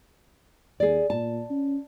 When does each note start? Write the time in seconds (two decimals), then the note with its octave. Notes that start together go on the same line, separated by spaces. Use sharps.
0.80 D#2 G#4 D5
1.10 A#2 A5
1.50 C#4